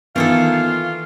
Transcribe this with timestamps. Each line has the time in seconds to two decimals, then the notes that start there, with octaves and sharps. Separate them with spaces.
0.16 D#3 E3 A#3 B3 F4 A4 F5